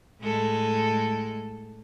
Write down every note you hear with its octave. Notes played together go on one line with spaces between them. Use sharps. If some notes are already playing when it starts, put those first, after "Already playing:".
A2 G#3 A4